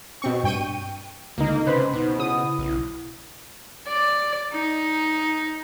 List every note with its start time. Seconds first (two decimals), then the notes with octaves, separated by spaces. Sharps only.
0.22 B2 C4 C#6
0.44 G2 G5 C#6 D#7
1.38 C#2 D3 A#3 D#4
1.67 C3 C#4 B4 C5 B5
1.94 B2 D#4
2.19 C#3 E4 D#6
2.59 B1
3.88 D5
4.53 D#4